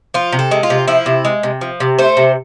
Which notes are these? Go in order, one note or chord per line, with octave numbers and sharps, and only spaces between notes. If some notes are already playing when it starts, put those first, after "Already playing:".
F3 F4
C3
A4
G#3
F4
C3
F3 E4
C3
G#3
C3
F3
C3
A3 C5
C3